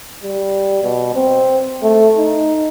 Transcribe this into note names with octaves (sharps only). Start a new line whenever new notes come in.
G3
B2
C4
A3
D#4